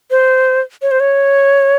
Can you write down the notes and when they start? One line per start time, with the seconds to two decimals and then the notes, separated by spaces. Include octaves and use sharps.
0.11 C5
0.82 C#5
0.91 C5
1.00 C#5